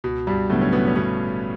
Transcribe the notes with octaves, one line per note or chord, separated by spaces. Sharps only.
C#2 B2
G2 G3
A2 C#3 F#3 A3 B3 D4
C#4
B2 B3
C#4
G1 B2 B3